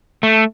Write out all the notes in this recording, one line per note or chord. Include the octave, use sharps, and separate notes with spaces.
A3